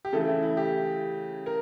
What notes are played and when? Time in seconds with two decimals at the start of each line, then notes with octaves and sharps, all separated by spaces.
0.05 G4
0.12 C#3 E3 A3 A4
0.27 E4
0.42 E4
0.57 G4
1.46 A#4